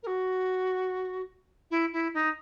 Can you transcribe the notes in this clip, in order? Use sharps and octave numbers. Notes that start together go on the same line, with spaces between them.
A#4
F#4
E4
E4
D#4